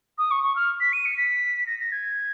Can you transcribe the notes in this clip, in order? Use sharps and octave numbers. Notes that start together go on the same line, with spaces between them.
D#6
C#6
C#6
F6
B6
D#7
C#7
B6
A#6
A#6
G#6